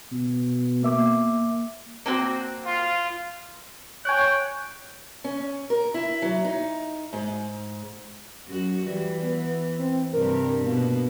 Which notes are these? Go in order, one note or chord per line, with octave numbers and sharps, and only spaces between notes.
B2
A#3 E5 D6
A#3 C4 F#4
F4
C#5 G5 G#5 F#6
C#4
A#4
E4
F#3
D#4
G#2
F#2 F#4
E3 G3
B3
C4
G2 C3 G3 A#4
B2 A#3